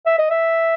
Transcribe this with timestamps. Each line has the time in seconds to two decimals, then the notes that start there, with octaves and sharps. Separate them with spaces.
0.06 E5
0.19 D#5
0.30 E5